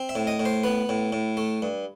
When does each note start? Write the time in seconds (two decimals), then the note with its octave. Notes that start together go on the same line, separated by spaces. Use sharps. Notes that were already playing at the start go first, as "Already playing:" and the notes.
Already playing: C4
0.09 E5
0.15 A2
0.27 D#5
0.40 A2
0.45 C5
0.63 B3 B4
0.89 A2
1.12 A2
1.37 A3
1.62 G2